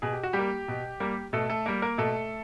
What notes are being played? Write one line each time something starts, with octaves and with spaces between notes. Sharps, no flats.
B2 G#4
G4
F#4
G3 G4
A#3
B2
G3 A#3
B2 A3 A4
A3 A4
G3 A#3 A#4
A#3 A#4
B2 A3 A4